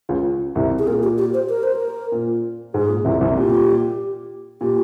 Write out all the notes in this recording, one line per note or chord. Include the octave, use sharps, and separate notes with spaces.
C#2 C#3
C2 C3
G#4
A#2 A#4
G4
G4
C5
A#4
C5
A#4
A#2
G#2 G#4
A#2
C2 C3
C2 C3
A#2 G4
A#2 G4